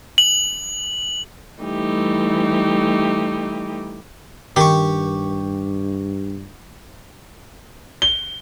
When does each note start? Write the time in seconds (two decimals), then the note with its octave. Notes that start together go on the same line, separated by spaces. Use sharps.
0.18 F#7
1.60 E3 G3 A3 D#4 G4
4.56 G2 D#3 G4 C#6
8.02 G7